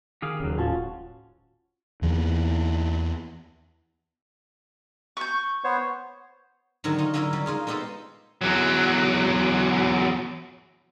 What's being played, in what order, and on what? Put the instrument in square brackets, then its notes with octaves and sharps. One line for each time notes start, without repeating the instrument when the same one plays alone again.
[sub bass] D#3 [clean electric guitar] G4 G#4 F5
[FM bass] D#1 [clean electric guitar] C#3 F#3
[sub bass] A2 [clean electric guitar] C#4 [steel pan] F4 F#4 A5
[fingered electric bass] E2 E3 F3 A#3
[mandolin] C#6 G6
[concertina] B3 C5 C#5
[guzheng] G#2 D3 D#3 F#3 F#4 A#5
D#4 F4 A#5
D3 F#3 C#4 D#4 E4 A#4
C#3 G3
G#3 D#4 F4 G#4
G#3 B3 D#4 G4 A4 C5
[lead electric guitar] E2 F#3